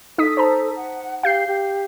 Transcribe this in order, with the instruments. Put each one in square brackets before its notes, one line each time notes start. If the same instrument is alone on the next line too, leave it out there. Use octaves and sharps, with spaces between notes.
[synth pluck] D#4 D#6 B6 [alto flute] A4
[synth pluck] C5 A5 A#5
[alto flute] F#5
[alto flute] G4 [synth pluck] F5 G6 C7
[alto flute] G4